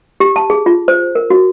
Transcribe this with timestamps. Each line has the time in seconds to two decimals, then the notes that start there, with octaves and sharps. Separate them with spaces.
0.20 G4
0.36 A5
0.50 G#4
0.66 F4
0.88 C5
1.15 A#4
1.30 F#4